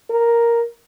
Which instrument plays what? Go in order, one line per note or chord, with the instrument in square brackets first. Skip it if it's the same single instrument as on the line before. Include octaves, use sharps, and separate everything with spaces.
[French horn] A#4